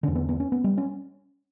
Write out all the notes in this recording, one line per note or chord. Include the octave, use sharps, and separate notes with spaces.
E2 D3 C#4
B3
B3
C#4
B3
G3
C#4